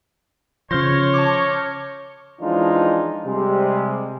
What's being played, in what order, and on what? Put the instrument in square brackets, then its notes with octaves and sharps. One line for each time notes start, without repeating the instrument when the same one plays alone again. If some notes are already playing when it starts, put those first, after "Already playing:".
[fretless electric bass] C#3 F3 [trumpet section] C#5 [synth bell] C6 [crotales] F6 G6 A#6
[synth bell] A5 C#6 D6
[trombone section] E3 F3 G#3 D4 D#4 F4
C3 G3 G#3